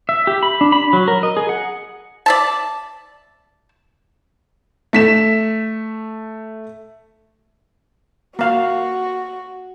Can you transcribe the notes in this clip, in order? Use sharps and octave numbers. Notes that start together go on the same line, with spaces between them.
E5
G4
B5
D4
B5
F#3
A#4
D#5
G#4
F#5
D5 E5 A5
A3 B6 E7
A#3 F#4 F5